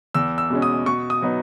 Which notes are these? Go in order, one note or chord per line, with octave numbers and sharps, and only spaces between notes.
E2 E6
E6
B2 G#3 C#4
D#6
B2 C#6
D#6
F#3 B3 D#4